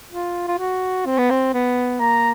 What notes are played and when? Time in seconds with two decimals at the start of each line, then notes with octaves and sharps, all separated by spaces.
0.13 F4
0.48 F4
0.59 F#4
1.06 C4
1.18 B3
1.30 C4
1.54 B3
2.00 A#3 A#5